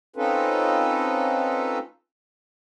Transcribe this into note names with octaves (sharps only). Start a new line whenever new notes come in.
C4 C#4 D#4 F4 A4 B4